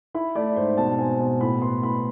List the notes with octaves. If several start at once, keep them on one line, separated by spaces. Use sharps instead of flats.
E4 B5
A3 D5
G#2 C5
B2 A5
C4 G#5
B2 A5
A2 B5
B3 C6
A2 B5